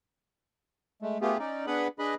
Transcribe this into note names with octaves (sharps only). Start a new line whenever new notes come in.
G#3 A3
A3 B3 F4 G4 G#4
C#4 D#4 D5
B3 D4 G#4 B4 F#5 B5
D4 G#4 B4 D#5 B5